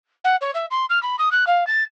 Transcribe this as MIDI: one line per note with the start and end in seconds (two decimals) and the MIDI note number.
0.24 0.36 78
0.41 0.51 73
0.54 0.65 76
0.70 0.85 84
0.89 1.01 89
1.03 1.16 83
1.19 1.29 87
1.31 1.44 90
1.47 1.67 77
1.67 1.83 93